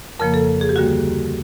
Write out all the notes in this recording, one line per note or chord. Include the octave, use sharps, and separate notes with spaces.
F2 C#3 F3 A#3 A#4
A4
G#4
G4
D2 D3 G3 A#3 F#4